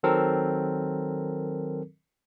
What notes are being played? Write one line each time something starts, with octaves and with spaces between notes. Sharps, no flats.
D#3 F#3 C4 A4 A#4